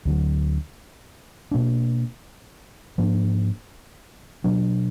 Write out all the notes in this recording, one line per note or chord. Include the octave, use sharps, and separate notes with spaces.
D2 D3 F#3
B2 A#3 D4
G#2 F3 A#3 D4
B2 F#3 D4